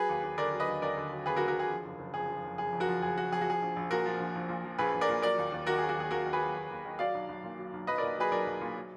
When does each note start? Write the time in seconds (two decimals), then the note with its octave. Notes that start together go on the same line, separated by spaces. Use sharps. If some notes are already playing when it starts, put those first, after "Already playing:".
Already playing: F#3 G#4 B4
0.09 D#2
0.23 D#2
0.38 D3 A#4 D5
0.53 F#3
0.60 B4 D#5
0.67 D#2
0.82 D#2 A#4 D5
0.97 D3
1.12 F#3
1.26 D#2 G#4 B4
1.36 F#4 A#4
1.41 D#2
1.48 F#4 A#4
1.55 D3 G#4
1.70 F3
1.84 F#1
1.99 F#1
2.14 F2 G#4
2.29 F3
2.44 F#1
2.58 F#1 G#4
2.72 F2
2.80 F#4 A#4
2.88 F3
3.02 F#1 G#4
3.17 F#1 F#4
3.32 F2 G#4
3.41 F#4
3.47 F3 G#4
3.62 A#1
3.76 A#1
3.91 A#2 F#4 A#4
4.05 F3
4.20 A#1
4.35 A#1
4.49 A#2
4.65 F3
4.78 A#1 G#4 B4
4.94 A#1
5.01 A#4 D5
5.09 A#2
5.22 F#3 A#4 D5
5.38 D#2
5.52 D#2
5.67 D#3 F#4 A#4
5.78 G#4
5.82 F#3
5.89 F#4
5.97 D#2 G#4
6.11 D#2 F#4 A#4
6.26 D#3
6.33 G#4 B4
6.41 F#3
6.55 D#2
6.70 D#2
6.85 D#3
6.99 F#3 D5 F5
7.15 B1
7.29 B1
7.44 A#2
7.58 F#3
7.73 B1
7.87 B1 B4 D#5
7.98 A#4 D5
8.03 A#2
8.18 F#3 G#4 B4
8.31 B1 A#4 D5
8.47 B1
8.61 A#2
8.76 F#3